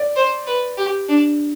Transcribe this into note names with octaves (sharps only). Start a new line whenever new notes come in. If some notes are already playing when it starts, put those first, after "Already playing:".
Already playing: D5
C5
B4
G4
D4